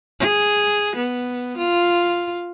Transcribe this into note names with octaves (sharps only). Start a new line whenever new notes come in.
G#4
B3
F4